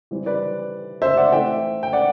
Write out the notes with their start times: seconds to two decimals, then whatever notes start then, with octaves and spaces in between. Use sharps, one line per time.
0.11 E3 G3 C4
0.26 B4 D5
1.02 C5 E5
1.17 D5 F#5
1.32 E3 A3 C4 E5 G5
1.83 G5
1.93 D5 F#5